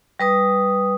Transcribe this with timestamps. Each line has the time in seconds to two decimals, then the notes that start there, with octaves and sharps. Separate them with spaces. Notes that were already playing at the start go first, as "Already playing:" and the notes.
0.20 G3 B4 D#6